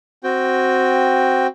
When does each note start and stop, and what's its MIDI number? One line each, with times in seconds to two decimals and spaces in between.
0.24 1.47 60
0.24 1.47 66
0.24 1.47 79